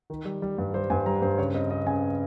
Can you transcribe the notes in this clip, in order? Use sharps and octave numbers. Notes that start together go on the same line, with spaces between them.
D#3
G3
G3
G2
G3 C5
G2 G#5
G3 A#5
G2 C5
C#3 C#5
C4 D#5
C4 D#5
C#3 G#5